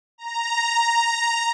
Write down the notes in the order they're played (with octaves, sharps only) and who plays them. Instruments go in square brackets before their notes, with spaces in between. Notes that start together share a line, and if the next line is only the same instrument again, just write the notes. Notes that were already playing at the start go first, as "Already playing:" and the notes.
[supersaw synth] A#5